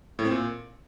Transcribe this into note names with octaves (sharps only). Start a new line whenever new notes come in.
A2
C4
A#2